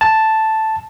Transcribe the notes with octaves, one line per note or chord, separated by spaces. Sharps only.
A5